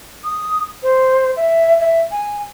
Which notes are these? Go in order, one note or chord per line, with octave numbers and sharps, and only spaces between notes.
D#6
C5
E5
E5
G#5